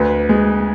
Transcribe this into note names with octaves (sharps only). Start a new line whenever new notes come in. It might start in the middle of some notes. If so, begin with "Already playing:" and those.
Already playing: D2 B4
G#3